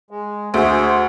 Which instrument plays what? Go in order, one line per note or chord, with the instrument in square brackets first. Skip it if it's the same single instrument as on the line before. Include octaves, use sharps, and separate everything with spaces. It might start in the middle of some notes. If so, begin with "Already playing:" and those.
[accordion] G#3
[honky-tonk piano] D2 [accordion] G#4 C5 E5